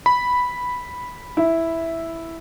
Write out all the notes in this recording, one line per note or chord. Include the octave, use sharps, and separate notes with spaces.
B5
E4